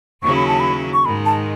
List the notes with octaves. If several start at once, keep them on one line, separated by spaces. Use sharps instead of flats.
D#2 C#3 F#3 C#4 E4 C#6
B5
A5
B5
C#6
G#2 D#3 G#3 B5
A5